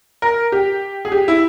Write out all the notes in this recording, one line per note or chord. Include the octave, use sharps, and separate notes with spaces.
A#4
G4
G#4
G4
E4